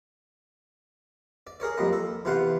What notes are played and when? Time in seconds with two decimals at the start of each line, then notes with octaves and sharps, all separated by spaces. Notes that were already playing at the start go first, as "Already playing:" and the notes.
1.47 D5
1.60 G#4 A#4 C#5 D5
1.77 F2 G3 A#3 D#5
1.93 A4
2.25 E2 C3 F4 C5 F#5